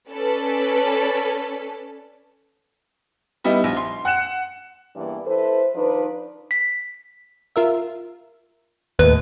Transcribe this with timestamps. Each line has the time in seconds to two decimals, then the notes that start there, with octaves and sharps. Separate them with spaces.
0.10 C#4 A4 B4 D5
3.44 G3 B3 D#4 E4
3.64 A#1
3.77 C6
4.05 F#5 F#6 C#7 E7
4.95 E2 G2 C#3 E3 A#3 D5
5.26 E4 A4 B4 C5
5.75 D#3 F3 D4 D#4 B4
6.51 B6
7.56 F4 A#4 E5
8.99 D#2 A2 B4